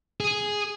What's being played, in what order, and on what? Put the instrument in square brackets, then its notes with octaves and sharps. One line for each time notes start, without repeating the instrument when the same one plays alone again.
[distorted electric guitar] G#4